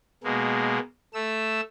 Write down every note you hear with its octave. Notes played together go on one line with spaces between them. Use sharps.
B2 G#3 A#3
A3 E6